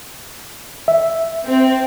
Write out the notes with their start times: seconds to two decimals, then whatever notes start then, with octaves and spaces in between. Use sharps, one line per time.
0.88 E5
1.47 C4